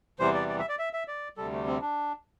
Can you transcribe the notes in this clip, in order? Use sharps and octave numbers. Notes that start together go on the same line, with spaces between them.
E2 C3 E3 G3 C5
D5
D5
E5
D5
E5
E5
D5
D2 C3 G3 A4
A3
C4
D4